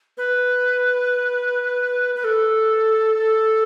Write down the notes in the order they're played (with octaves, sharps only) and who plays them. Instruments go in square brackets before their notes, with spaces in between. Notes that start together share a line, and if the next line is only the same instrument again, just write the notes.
[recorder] B4
B4
A4